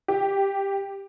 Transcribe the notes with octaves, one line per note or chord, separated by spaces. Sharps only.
G4